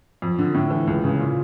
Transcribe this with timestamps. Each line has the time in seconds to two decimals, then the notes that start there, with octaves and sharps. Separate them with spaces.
0.22 F2
0.39 D3
0.54 A2
0.70 E3
0.87 C#2
1.04 C#3
1.20 A#2